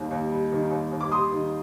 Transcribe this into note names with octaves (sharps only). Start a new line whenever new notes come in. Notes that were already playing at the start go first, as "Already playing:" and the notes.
Already playing: D#2 D#3 G3
D#2
G3
D#3
D#2
D#2
D6
G3 C6 D#6
D#3